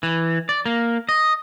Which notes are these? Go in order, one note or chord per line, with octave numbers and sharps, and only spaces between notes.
E3
D5
A#3
D#5